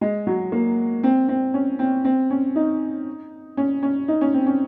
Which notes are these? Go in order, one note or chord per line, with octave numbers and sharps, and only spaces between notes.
G#3
F#3
A#3
C4
C4
C#4
C4
C4
C#4
D#4
C#4
C#4
D#4
C#4
C4
C#4